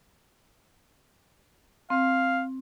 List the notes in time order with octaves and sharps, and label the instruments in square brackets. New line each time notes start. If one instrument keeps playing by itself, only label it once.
[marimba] C4 [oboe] F5